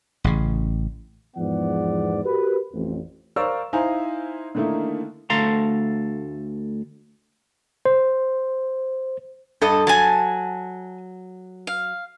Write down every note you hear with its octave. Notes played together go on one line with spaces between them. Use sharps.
A1 C#3
E2 G#2 F3 B3 D5 F#5
F#4 G4 A#4 B4
A1 F2
A#4 C5 D5 F5 C#6 E6
D#4 E4 C5 F5 G#5 A#5
D3 D#3 A3 A#3 D#4 E4
D2 A3 A4 F5 A#5 C6
C5
G2 A4 D#5
F#3 G#5 A5
F5